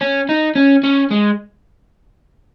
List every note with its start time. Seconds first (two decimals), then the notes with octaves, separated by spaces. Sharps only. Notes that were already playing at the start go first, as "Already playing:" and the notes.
0.01 C#4
0.29 D#4
0.55 C#4
0.83 C#4
1.11 G#3